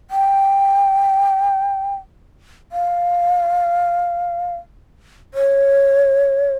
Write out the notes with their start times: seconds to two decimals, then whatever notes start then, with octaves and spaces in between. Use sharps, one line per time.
0.11 G5
2.72 F5
5.34 C#5